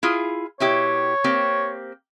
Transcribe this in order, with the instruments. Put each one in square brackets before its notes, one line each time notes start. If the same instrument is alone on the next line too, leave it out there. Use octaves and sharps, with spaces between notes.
[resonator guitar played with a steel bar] E4 F4 G#4
[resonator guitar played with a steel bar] B2 E4 G4 [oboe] C#5
[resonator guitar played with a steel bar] A#3 C4 G4